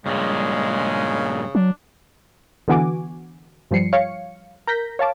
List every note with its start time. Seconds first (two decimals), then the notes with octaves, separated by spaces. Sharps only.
0.06 G2 A#2 C#3 G#3
1.55 F#3 D4
2.68 D3 E3 B3 F#4 G#5 D6
3.71 G2 F3 G3 C7 C#7
3.93 C#5 F5 C#7
4.67 A#4 G6 A#6 B6
4.99 C#5 F5 A5 D6